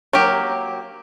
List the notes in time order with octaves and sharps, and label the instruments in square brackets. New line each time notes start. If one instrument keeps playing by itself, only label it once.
[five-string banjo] F#3 A#3 G4